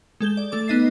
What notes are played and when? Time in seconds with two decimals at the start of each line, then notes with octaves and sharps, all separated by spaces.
0.20 G#3 A4 G6 G7
0.37 D5
0.52 A3 A4 D6
0.68 B3 D#4 D#5 A6 C7